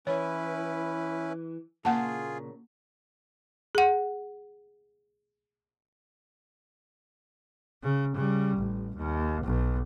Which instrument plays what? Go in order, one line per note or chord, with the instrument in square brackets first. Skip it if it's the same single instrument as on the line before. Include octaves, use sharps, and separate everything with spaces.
[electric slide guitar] E3 [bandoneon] C#4 E4 B4 [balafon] C#5
[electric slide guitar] A#2 C#3 [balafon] A#3 F#5 A5 [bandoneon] F4 G#4
[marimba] G#4 F#5
[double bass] C#3
C#3 G3
A1
D#2
B1